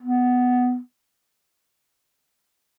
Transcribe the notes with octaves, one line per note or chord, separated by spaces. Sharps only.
B3